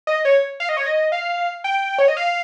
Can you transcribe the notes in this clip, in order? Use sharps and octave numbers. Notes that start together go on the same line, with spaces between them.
D#5
C#5
F5
D#5
C#5
D#5
F5
G5
C#5
D#5
F5